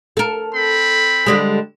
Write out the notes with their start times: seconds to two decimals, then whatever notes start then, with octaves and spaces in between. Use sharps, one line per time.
0.17 A4 A#4
0.55 C4 B5
1.26 D3 G3 G#3